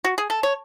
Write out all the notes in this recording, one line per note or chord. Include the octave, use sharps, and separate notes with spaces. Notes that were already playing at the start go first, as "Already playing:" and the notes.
F#4
G#4
A4
C#5